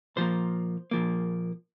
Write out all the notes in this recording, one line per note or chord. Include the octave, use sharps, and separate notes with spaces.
A#2 F3 A#3 C5
A#2 F3 A#3